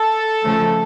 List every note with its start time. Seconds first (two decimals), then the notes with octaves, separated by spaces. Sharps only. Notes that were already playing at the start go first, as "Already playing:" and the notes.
Already playing: A4
0.44 C#3 F3 A3